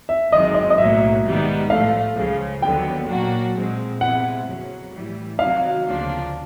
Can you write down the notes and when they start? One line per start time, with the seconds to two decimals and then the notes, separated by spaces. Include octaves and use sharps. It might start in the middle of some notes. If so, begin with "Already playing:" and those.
0.09 E5
0.32 G1 F#2 D#3 G#3 C4 D#5
0.55 D#5
0.70 D#5
0.78 B1 A2 F#3 A#3 E5
1.24 G#2 D#3 G3 B3 D#4
1.70 A2 F3 A3 F5
2.16 C#2 C#3 F3
2.62 D#2 D3 F#3 B3 G5
3.09 A#2 F#3 A#3 D4 F#4
3.54 A#2 F3 G#3 C4
4.00 C3 F3 G#3 B3 E4 F#5
4.46 F2 C#3 F#3
4.93 A2 E3 G3
5.38 C3 D#3 F#3 B3 F5
5.85 D2 C#3 F3 A#3 D4